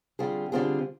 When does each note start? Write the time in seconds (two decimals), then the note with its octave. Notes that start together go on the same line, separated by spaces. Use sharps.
0.19 D3 G3 C4 F4 G#4
0.52 D3 G3 C4 F4 G#4